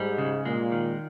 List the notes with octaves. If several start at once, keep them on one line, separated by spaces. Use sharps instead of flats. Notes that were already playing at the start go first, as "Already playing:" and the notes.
Already playing: G#2 G3
C#3
A#2 G#3
D#3